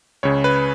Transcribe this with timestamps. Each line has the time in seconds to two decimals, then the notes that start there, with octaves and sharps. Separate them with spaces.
0.23 C#2 C#3 C#5
0.44 B4